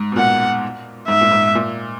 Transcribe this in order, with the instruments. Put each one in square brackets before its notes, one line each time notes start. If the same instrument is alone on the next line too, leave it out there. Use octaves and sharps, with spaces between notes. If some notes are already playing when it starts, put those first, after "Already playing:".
Already playing: [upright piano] G#2
B2
[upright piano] A#2 [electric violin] F#5
[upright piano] G#2 [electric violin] E5
[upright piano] A#2
G#2
A#2